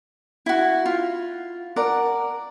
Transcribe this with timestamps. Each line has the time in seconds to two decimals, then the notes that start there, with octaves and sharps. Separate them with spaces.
0.46 E4 F#4
0.86 F4
1.76 A#4 D5 F#5